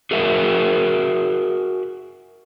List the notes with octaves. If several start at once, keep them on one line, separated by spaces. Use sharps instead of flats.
F#4 G#4 A#4 E5